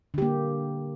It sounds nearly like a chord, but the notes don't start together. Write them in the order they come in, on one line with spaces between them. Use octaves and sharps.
D3 G4 A#3